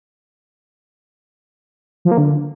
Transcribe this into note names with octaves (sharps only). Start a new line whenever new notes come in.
F3
A#3
D3